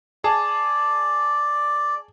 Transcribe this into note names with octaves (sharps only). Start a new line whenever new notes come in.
G#4 D5 A5